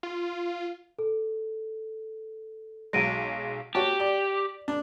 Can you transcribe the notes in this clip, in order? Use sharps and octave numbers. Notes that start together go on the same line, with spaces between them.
F4
A4
B1 F#3 G#3 A#6 D7 D#7
F#4 G4 C#5 A5
D5
D4